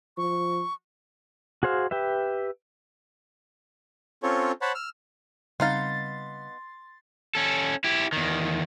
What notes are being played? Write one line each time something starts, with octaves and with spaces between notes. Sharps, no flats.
F3 C#6
F#4 G#4 C5 F5
G4 B4 E5
C4 C#4 F4 A4 C#5
C5 C#5 F#5 A5 B5
E6 F6
C#3 G3 B3 C4 D#4 F5 C6 A6
C#4 A4
E4 G4
E2 D#3